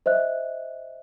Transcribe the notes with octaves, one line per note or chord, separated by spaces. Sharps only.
C5 D#5 E5 F#6